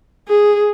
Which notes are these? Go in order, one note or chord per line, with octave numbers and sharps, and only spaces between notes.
G#4